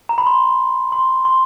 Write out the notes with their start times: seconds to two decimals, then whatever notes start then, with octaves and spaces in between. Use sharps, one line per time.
0.09 A#5
0.18 B5
0.27 C6
0.92 C6
1.25 C6